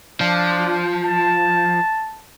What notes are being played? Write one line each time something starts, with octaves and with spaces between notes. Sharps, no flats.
F3 D4
A5